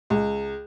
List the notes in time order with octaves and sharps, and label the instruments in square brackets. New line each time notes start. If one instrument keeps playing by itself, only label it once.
[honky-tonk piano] C#2